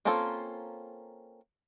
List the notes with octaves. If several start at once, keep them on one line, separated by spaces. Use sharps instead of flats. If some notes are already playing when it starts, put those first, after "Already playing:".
A#3 C4 C#4 F4 A4